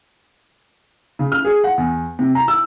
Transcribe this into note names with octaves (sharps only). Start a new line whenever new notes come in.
C#3
F6
G#4
F#5
E2
C3
A#5
E6